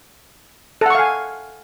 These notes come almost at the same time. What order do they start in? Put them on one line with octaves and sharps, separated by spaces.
A4 F#5 C#6 F5 G#5